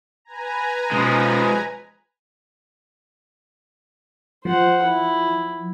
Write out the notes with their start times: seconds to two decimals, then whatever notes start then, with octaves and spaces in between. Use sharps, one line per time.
0.25 B4 G#5 A#5
0.91 B2 F3 G#3 C#4
4.45 F3 C5 F#5
4.82 E4